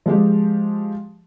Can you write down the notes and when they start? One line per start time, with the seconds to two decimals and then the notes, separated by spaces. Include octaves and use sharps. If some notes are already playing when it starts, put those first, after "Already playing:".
0.06 F3 G#3 G4